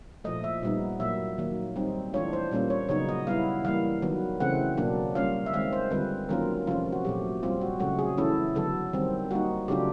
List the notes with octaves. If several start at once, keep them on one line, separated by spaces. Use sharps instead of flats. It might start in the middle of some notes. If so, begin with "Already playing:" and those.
A#2 F3 A3 D#5
E5
A#2 G3 B3 D#4
A#2 F#3 A#3 E5
D#3 F#3 A#3
G3 C4 D#4
E3 A3 D4 F4 C#5
C5
A#2 G3 A#3 C#4 F4
C#5
C#3 F#3 B3 D#4 C#5
D#5
G3 B3 E4 F5
E3 G3 A#3 F5
D#3 F#3 B3
C#3 E3 A3 C4 F#5
B2 F#3 A#3 D4
G3 A#3 C#4 F4 F5
E5
D#3 G#3 C4 F5
C5
D3 G3 C4 F4 B4
D#3 F#3 A#3 C#4 F4 A#4
C3 F3 A3 C#4 F4
F#4
A#2 F#3 A3 G4
G3 C4 F4
F#4
C#3 F#3 A3 F#4
G#4
E3 A3 C#4 E4 A4
D3 F#3 B3 A4
D#3 G3 C4
G3 A#3 D#4 F#4
C#3 F#3 A3 D4 F4 G4